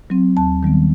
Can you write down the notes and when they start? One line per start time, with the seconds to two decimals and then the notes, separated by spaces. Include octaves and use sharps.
0.10 F#3 C4
0.37 D#2 A5
0.63 D#3 G3 B3